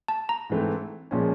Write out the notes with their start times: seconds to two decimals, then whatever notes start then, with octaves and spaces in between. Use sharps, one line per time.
0.08 A5
0.29 A#5
0.50 G#2 E3 A3 C4
1.11 A#2 F3 G#3 C#4